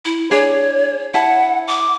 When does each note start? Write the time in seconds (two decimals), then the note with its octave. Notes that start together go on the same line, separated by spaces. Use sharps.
0.05 E4
0.31 D4 G#4 C#5
1.14 E4 F#5 A5
1.68 D6